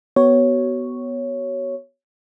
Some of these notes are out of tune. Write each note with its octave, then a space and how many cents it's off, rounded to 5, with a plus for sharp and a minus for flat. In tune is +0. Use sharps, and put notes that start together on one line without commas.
B3 +0 F#4 +35 C#5 +0